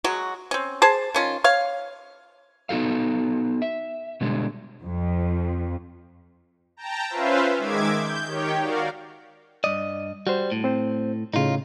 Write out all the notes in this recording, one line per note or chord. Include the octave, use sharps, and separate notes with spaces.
F#3 G#3 F#4
C4 C#4
G#4 C5 A5
D#3 C#4 F4
C#5 F5
B3 D#4 F#4 A4 F5
E5
B2 D3 G3 G#3
F2
G5 A5 A#5
C#4 F4 B4 C5 E5 F5
D#3 G#3 E5 D6 G#6
G6
D#3 G4 C#5 G5
F#4 A#4 D5 F5
G2 D5 D#5
G3 F#4 C5
A2
C4 C5
A2 C#3 D#4 F4